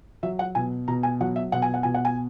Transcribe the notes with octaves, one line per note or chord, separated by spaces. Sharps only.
F#3 E5
F#5
B2 G#5
B2 A#5
G#5
F#3 F#5
E5
B2 F#5
G#5
F#5
B2 G#5
F#5
G#5